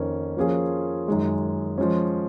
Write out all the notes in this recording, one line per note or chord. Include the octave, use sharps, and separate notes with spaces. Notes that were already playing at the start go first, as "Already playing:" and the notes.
Already playing: F2 D#3 A#3 C#4
F3 A#3 C#4 F4 G#4
F#2 D#3 G#3
F3 G#3 C#4